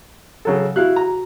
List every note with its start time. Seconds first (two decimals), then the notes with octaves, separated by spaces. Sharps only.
0.45 C#3 F#3 A4
0.76 E4 F#4 F5 F#6
0.96 A#5